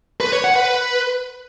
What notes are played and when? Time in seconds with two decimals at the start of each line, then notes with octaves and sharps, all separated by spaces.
0.20 B4
0.32 C#5
0.44 F#5
0.56 B4